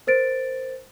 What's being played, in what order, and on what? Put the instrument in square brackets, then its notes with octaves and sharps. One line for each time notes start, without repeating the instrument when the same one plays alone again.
[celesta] A#4 C5 A6 D7